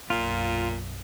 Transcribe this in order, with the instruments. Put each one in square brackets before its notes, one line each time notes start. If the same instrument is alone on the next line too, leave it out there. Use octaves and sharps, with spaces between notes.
[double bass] B1 F#2 [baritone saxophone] A#2 [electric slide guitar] F4